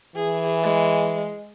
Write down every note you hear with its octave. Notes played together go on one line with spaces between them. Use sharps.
E3 G#4
G#3